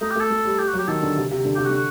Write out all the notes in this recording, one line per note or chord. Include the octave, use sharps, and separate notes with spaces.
A3 D#4
G4
A3
A4
A3
G3
G3 G4
F#4
F#3
G4
D#3 A4
D3
C3
C3
D3
C3 G4
F#4
D3
F#4